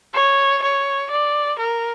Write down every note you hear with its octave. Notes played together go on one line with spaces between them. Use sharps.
C#5
C#5
D5
A#4